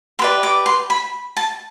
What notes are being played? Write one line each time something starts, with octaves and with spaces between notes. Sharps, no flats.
G4 B4 D5 C6
D6
C6
B5
A5